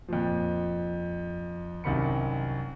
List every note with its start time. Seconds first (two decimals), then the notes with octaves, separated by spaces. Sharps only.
0.08 F2 A#2 F3
1.84 C2 F#2 C3 D#3 B5 C#7